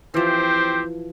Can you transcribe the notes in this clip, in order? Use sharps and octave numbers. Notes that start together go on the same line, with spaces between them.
E3 F3 C4 G4 C5